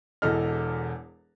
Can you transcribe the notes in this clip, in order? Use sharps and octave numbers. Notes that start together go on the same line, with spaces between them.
E1 E2 A4 D#5 F6